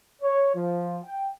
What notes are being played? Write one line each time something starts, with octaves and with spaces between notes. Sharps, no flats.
C#5
F3
G5